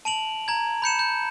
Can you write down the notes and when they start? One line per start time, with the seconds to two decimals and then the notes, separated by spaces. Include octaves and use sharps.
0.05 A5 D7 F7 F#7
0.48 A#5 G#6
0.82 B5 G6 C#7 E7
0.99 G6